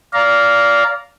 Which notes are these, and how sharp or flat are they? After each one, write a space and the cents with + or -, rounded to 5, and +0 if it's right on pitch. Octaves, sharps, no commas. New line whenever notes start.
D5 -25 F5 +0 A#5 +0